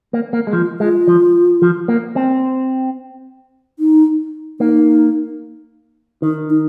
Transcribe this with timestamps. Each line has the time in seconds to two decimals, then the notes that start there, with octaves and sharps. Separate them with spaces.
0.13 A#3
0.33 A#3
0.47 G#3
0.53 F3 F4
0.79 G#3 F4
1.08 F3
1.62 F3
1.88 A#3
2.16 C4
3.79 D#4
4.60 A#3 D#4
6.22 D#3 D#4
6.49 D#4